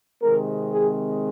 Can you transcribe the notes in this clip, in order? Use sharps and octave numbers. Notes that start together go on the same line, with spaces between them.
C3 D#3 G#3 C4 A#4
G#4